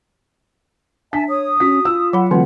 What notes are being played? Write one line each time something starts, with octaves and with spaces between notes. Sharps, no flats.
D4 E5 G#5 A5 B6
C#5 D#6
C#4 F#4 B6
F4 E6
F#3 F#5 B5
D3 E3 F#3 A3 C4 F4